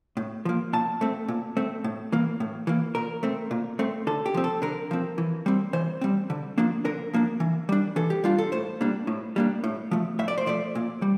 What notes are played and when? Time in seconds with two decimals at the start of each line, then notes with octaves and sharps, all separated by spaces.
0.17 A2
0.45 F3 A#3
0.73 A#2 A5
1.01 A3 C4
1.28 A#2
1.57 A3 C4
1.84 A2
2.12 E3 A#3
2.40 A2
2.67 E3 A#3
2.95 A#2 A#4
3.23 A3 C4
3.51 A#2
3.79 A3 C4
4.07 D3 A4
4.26 G4
4.34 F3 C4
4.44 A4
4.62 D3 A#4
4.91 F3 C4
5.18 E3
5.46 G3 C4
5.73 E3 C5
6.01 G3 C4
6.30 D3
6.58 F3 A#3 D4
6.85 D3 A#4
7.13 F3 A#3 D4
7.40 E3
7.69 G3 D4
7.96 E3 A4
8.10 G4
8.24 G3 D4 F4
8.38 A4
8.52 A2 C5
8.81 G3 A#3 D4
9.07 A2
9.36 G3 A#3 D4
9.64 A2
9.91 F3 A3
10.19 A2 E5
10.28 D5
10.38 C5
10.46 F3 A3 D5
10.75 A#2
11.02 G3